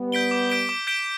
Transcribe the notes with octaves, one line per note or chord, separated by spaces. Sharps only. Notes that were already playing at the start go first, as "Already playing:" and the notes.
Already playing: G3 B3
G6 B6 D7 G7
D6
G6 B6 D7 G7
D6
G6 B6 D7 G7